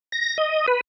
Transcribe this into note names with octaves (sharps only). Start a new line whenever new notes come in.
A#6
D#5
B4